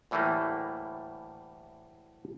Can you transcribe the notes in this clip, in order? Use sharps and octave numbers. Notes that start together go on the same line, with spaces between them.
D2 A2 E3 G3 A3 A#3